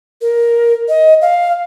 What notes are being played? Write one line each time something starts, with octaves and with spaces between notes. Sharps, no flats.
A#4
D#5
F5